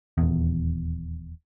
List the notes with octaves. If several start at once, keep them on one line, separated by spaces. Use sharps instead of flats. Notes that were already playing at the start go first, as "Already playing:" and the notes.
D#1 E2